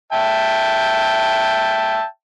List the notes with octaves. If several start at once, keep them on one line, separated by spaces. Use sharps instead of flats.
E5 G5 A5